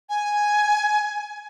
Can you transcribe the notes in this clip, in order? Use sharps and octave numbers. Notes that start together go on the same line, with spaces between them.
G#5